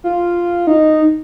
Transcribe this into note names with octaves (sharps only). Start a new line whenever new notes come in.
F4
D#4